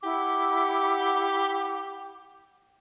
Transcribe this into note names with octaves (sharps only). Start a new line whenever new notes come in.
E4 G4 F#5 D6